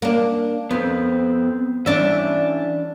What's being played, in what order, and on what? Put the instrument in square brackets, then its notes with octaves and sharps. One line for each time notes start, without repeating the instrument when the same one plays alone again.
[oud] A#3 D4
[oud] F2 [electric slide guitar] B3 C4
[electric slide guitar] E3 C#4 [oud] D4 E5